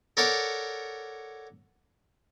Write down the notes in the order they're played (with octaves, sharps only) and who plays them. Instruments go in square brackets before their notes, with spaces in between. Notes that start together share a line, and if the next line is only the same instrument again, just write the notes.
[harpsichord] A4 A#4 C#5 D5 F#5